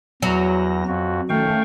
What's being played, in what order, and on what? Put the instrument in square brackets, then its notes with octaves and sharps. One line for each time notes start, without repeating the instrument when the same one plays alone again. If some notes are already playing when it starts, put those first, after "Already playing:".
[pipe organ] E2 A#6 [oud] F#3
[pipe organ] F2 F#4
[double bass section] D#3 A3 C#4 [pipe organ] F5 G5 C#6